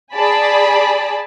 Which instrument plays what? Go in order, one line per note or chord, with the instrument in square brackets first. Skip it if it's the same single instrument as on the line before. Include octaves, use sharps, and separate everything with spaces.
[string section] G#4 D5 G#5 A5 B5